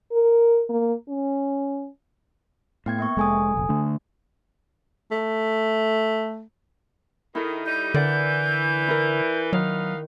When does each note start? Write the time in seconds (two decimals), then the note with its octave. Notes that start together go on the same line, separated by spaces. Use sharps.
0.12 A#4
0.69 A#3
1.08 C#4
2.86 A2 B3 G5 G#6
2.99 A#3 E5 C#6
3.17 F1 G#3 A4 G#5 D#6
3.54 F1 A#1
3.69 D3 A3 D4
5.11 A3
7.35 D#3 E4 G#4 A4
7.66 G3 D#4 G6
7.94 D3 E3 A#4 D5 F#5
8.88 E4 A#4
9.53 D#3 F#3 B3 D#4 F5